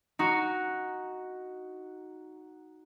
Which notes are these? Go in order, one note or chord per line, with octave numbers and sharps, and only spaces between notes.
D#4 F#4